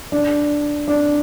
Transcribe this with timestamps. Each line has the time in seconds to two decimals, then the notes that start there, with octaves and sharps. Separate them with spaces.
0.12 D4
0.88 D4